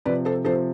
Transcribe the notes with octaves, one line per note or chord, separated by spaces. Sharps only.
C3 F3 B4 D5
A4 C5
C3 F3 A4 C5